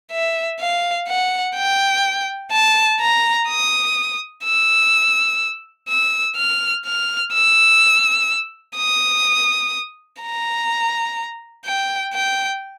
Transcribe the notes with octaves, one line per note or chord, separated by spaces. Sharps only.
E5
F5
F#5
G5
A5
A#5
D#6
E6
E6
F6
F6
E6
D#6
A#5
G5
G5